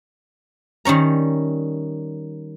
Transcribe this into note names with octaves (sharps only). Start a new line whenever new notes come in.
D#3 G3 C#4 A#5